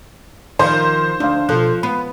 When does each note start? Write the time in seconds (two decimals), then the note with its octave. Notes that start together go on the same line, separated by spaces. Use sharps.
0.59 D#3 F3 C5
1.20 D2 D4 F5
1.49 B2 F3 A4 F#6
1.83 B3 B5